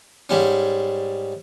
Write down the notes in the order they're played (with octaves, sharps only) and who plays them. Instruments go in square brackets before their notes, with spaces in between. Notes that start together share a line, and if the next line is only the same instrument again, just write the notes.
[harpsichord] G#2 G3 C#4